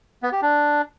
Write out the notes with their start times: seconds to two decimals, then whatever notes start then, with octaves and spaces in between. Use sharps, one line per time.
0.23 B3
0.32 G4
0.42 D4